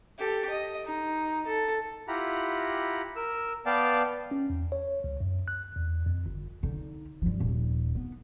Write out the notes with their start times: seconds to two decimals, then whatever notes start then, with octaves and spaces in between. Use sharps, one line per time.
0.19 G4 A4
0.50 D#5
0.85 D#4
1.47 A4
2.08 E4 F4 G4 F#5 A#5 B5
3.16 A#4 E6
3.66 B3 D5 F5 G5 A5
4.31 C#4
4.50 E2
4.72 C#5
5.04 C#2
5.20 F#2
5.48 F#6
5.76 E2
6.06 F2
6.26 G1
6.63 D3 D#4
7.22 G2 F3
7.40 D#1
7.95 B3